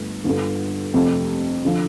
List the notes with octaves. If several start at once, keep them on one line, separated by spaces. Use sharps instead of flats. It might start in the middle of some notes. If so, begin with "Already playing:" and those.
Already playing: G1 A3
G1 G2 D3
F2 C3 A3
D3 F3